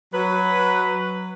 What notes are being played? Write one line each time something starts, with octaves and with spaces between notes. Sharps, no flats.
F#3 B4